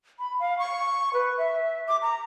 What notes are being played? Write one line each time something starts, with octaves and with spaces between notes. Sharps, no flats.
B5
F5
C#6
B4
E5
D6
A#5